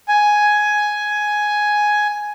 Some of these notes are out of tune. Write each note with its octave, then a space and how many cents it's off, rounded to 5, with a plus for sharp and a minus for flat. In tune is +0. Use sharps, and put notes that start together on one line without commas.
G#5 +5